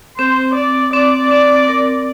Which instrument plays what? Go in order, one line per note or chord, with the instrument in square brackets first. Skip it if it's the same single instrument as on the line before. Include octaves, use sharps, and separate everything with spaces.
[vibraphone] C4 [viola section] C5
[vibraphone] C4 [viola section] D5
[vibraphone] C4 [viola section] D5
[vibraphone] C4
A#4